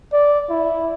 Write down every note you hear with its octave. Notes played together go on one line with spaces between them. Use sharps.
D5
E4